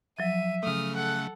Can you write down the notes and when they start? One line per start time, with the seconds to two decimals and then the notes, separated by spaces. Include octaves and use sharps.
0.19 F3 F#3 E5 D#7
0.63 C#3 A3 D#6 F6
0.95 A4 F#5 F#6